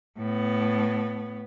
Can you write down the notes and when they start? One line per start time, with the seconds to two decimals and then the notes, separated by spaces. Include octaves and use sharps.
0.18 A2 B3